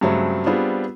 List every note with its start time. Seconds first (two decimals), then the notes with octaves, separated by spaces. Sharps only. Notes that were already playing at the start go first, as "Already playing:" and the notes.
0.01 G2 C#3 F#3 G#3 A3 C4
0.46 G3 B3 C4 D4 F4 G#4